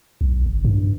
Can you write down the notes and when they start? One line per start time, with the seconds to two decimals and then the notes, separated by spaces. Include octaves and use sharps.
0.21 B1
0.46 G1
0.65 G2